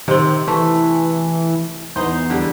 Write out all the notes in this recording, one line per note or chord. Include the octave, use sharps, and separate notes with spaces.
C3 D#3 C4
E3 A3
E2 D#4 C5
D3 G3